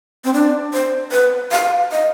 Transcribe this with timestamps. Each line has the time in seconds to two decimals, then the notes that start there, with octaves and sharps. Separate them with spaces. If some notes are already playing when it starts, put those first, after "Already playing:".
0.24 C4
0.33 D4
0.73 C5
1.12 B4
1.52 F5
1.92 D#5